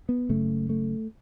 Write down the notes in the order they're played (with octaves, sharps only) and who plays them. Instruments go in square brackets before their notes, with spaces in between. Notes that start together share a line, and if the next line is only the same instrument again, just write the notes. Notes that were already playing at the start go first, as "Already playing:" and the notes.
[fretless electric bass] B3
F#1 F#2 C#3 A3
A3